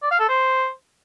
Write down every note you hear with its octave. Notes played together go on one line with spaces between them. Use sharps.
D5
F5
A4
C5